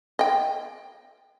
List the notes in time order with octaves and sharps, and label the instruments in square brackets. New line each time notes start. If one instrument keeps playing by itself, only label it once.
[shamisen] D#5 G5